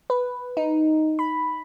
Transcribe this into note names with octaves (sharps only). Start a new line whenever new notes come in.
B4
D#4
B5